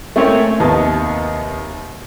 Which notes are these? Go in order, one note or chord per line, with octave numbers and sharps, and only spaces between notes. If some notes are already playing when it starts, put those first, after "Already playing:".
A3 A#3 C4 C#4 E4 C#5
D#2 C3 B3 D#5 A5